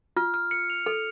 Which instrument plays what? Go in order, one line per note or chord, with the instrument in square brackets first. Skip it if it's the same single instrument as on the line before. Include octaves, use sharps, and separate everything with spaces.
[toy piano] F4 [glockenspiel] F6
[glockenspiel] F6
C#7
F7
[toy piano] A4 [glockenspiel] F7